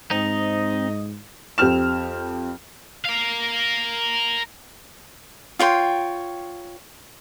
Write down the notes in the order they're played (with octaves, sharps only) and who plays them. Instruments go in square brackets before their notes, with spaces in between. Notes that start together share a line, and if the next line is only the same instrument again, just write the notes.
[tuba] G#2 [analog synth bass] C4 [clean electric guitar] D#4 [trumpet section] D#5
[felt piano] F2 C4 G4 F6 E7
[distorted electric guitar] A#4 F5
[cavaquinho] F4 C#5 G5 C6